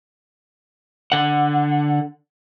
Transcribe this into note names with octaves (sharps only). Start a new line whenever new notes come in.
D3 F#5